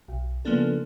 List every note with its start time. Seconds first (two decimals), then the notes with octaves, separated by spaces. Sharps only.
0.08 B1
0.45 C#3 F3 A#3 B3 D4 A4